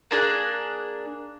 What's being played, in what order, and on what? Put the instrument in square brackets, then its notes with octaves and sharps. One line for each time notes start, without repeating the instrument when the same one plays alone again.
[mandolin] A#3 D4 G#4 F#6